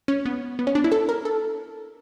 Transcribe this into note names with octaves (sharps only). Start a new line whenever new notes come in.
C#4
B3
B3
C#4
D4
E4
A4
A#4
A4